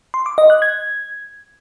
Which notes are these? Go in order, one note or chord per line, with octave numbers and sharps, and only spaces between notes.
C6
D6
D#5
F#6
G#6